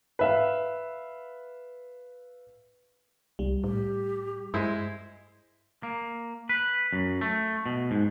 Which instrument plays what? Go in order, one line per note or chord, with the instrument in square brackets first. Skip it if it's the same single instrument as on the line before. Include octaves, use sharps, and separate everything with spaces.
[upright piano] B4 E5 F5
[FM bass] C2 [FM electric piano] G3
[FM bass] A2 [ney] G4
[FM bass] G2 [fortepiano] G#3 E4 C5
[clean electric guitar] A#3
B4
F#2
A3
B2
G#2